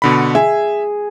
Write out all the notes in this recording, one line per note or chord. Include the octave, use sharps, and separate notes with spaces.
B2 D3 B5
G#4 E5